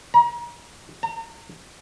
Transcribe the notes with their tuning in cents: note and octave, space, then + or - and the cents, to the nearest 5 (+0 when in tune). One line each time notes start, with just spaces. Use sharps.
A#5 +35
A#5 -40